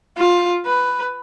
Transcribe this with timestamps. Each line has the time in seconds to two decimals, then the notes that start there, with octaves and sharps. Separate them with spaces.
0.18 F4
0.66 B4